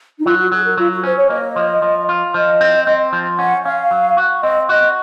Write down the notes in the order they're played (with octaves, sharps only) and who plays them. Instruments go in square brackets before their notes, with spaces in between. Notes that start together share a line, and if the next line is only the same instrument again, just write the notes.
[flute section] D#4
[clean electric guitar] F#3 [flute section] F4
[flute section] F#4
[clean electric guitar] F#3 [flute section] G#4
[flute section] A#4
[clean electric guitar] F#3 [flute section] F4
[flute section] F#4
[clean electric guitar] C#4 [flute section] C5
[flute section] C#5
[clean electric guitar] A#3 [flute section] D#5
[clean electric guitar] F3
F3
F4
[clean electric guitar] F3 [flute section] D#5
[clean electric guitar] C4
C4
F3
[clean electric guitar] C#4 [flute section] F#5
[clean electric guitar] C#4 [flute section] F5
[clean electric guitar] F#3
F#4
[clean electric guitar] C4 [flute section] D#5
[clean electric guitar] F#4 [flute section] D#5